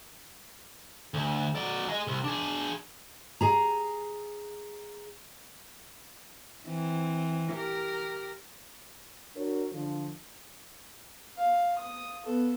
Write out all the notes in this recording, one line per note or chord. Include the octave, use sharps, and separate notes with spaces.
D2
F#3 D5
G#4 D#5
C2
D4 G#4
G#4 A#5
E3 C4
G4 A#4
D4 F#4 A#4 C#5
D3 F3
F5
D#6
B3 A4